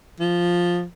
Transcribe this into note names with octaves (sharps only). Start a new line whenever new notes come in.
F3